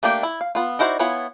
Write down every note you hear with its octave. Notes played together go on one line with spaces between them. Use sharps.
A3 A#3 D4 G4
E4
F5
B3 F4
D#4 E4 F#4 C5 D5
B3 E4 F4 C#5 G#5